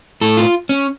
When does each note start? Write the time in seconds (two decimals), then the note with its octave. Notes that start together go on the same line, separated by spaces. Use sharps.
0.21 A2 A4
0.37 F4
0.69 C#4